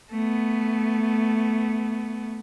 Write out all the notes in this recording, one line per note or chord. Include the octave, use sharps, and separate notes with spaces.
A3 B3